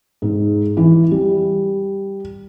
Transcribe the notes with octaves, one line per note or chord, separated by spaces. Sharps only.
G#2
E3
G3